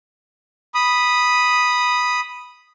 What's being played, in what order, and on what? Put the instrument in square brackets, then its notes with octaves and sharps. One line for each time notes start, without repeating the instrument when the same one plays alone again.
[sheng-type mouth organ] B5 D#6